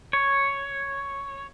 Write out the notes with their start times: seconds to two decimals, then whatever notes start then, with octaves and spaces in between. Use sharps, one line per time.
0.13 C#5